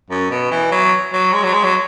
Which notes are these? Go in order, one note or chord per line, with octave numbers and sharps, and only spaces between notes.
F#2
B2
E3
F#3
F#3
G#3
F#3
G#3
F#3